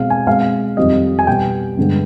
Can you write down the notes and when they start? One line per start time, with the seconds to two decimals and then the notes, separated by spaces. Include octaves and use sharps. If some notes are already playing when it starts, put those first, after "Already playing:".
Already playing: B2 G#3 C4 F5
0.10 G#5
0.27 B2 G#3 C4 F5
0.77 F2 D#3 G3 C4 D#5
1.19 G#5
1.27 B2 G3 B3 G5
1.77 G2 D3 G#3 B3